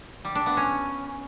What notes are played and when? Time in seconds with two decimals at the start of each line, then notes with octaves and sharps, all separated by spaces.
0.25 G3
0.35 D4
0.46 B3
0.57 C#4